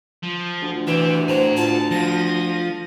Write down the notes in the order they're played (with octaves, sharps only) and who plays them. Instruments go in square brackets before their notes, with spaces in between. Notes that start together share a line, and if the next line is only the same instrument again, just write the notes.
[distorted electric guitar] F3
[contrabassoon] D2
[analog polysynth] E3 [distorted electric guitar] G4 E5 [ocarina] B4
[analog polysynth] A2 [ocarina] C5 [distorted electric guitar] G#5 A#5
[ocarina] F4 [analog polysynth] A5
[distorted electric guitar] F3 [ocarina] F4 [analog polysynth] A#6 D#7